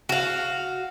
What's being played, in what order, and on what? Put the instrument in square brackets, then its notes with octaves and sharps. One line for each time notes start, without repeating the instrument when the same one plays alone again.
[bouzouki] F#4 F5